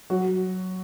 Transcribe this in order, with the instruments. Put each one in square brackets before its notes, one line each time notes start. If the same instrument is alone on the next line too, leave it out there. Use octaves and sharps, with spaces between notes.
[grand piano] F#3 F#4